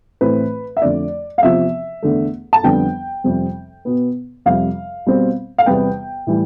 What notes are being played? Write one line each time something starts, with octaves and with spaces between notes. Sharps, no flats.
A2 E3 A3 C4 B4
E5
F2 D3 A3 D5
F5
E2 C3 F3 C4 E5
E2 D3 A3
A5
F2 D3 G3 B3 G5
F2 C3 G3 C4
B2 B3
F2 C3 G3 F5
B2 G3 C4
F5
E2 C3 G3 B3 G5
A2 E3 G3